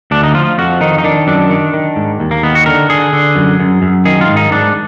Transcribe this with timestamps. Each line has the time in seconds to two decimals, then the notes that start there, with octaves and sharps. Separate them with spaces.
0.11 D2 D4
0.23 D#4
0.35 F3 F4
0.58 F2 F#4
0.81 D#3 D#4
0.98 D#4
1.04 D#3 D4
1.27 F#2 D4
1.50 D#3
1.74 D#3
1.96 G#2
2.20 D#2
2.31 A#3
2.43 D#3 B3
2.55 F#4
2.66 D3 A#4
2.89 D3 G#4
3.13 D3
3.36 F#2
3.60 F#2
3.82 F#2
4.05 D#3 G#4
4.21 F4
4.29 G#2
4.36 D#4
4.51 G#2 D4